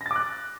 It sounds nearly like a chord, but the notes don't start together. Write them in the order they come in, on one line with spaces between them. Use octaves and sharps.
A#6 A6 D6 F#6